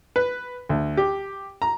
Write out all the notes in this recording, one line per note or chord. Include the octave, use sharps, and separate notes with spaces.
B4
D2
G4
A#5